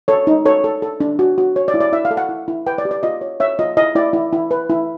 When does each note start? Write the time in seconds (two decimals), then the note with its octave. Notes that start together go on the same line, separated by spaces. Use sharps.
0.08 A4 C#5
0.27 D#4
0.45 A4 C#5
0.64 A4
0.82 A4
1.00 D4
1.19 F#4
1.38 F#4
1.56 C#5
1.68 D5
1.74 E4
1.81 D5
1.93 E4 E5
2.05 F5
2.11 A4
2.17 F#5
2.29 E4
2.48 E4
2.67 B4 G5
2.78 D5
2.85 G4
2.91 D5
3.03 F4 D#5
3.21 C#5
3.40 C#5 E5
3.59 F4 D#5
3.77 E4 D#5
3.95 E4 D5
4.13 E4
4.33 E4
4.51 B4
4.70 E4